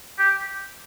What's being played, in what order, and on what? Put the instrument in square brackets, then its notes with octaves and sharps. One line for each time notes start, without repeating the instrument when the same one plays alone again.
[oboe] G4